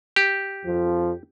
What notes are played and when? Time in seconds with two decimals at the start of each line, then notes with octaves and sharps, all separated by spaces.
0.16 G4
0.66 F2 F3